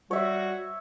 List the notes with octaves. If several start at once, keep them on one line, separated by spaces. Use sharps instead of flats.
G3 F#4 C#5 E5